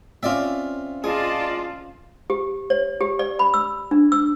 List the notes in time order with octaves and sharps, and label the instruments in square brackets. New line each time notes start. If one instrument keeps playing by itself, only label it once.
[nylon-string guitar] C4 C#4 [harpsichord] F4 D5 E5
[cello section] F4 [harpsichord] G#4 [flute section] D5 D#5 A5
[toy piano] G4
C#5
G4
D5
B5
E6
D4
E6